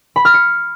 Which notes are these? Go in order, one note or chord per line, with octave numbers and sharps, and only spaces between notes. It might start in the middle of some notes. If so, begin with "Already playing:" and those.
B5
F6
C#7